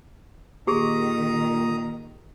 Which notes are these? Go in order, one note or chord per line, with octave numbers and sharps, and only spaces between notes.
A#2 D#3 G4 G#4 A#5 D#6